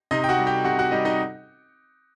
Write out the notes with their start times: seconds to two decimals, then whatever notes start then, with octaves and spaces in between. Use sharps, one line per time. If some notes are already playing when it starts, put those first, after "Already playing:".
0.11 C3 D#4 D#5
0.24 G5
0.29 F#4 F#5
0.39 G3
0.47 G4 G5
0.65 C3 F#4 F#5
0.79 F#4 F#5
0.91 G3 D#4 D#5
1.05 D#4 D#5